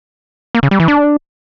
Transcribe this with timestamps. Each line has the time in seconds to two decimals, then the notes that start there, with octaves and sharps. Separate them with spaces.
0.55 A#3
0.63 C#3
0.71 G3
0.80 E3
0.88 D4